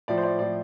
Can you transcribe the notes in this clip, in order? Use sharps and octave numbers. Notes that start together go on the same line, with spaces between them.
A2 F3 D5
C5
D5
A2 F3 D5